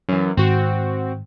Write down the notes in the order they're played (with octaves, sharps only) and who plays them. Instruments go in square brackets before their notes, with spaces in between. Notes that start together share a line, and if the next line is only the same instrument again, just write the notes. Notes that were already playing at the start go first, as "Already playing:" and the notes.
[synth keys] F#2 E3
[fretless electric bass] G#2 D#3 [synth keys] C4 F#4